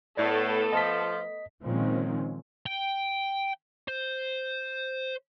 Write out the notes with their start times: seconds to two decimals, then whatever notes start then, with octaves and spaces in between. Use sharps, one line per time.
0.17 A2 A3 B3 A4 D5
0.73 F3 D#5 A5 B6
1.63 A#2 D#3 F3 G#3 C4 C#4
2.66 G5
3.88 C5